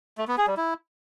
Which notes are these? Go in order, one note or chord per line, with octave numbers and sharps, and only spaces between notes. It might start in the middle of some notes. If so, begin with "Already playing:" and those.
A3
B3
G#4
G3
E4